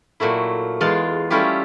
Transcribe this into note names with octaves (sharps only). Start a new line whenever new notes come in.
A#2 F#3 A3 E4
E2 G#3 F4 F5 C6
G3 A3 C#4 E4 F4 G4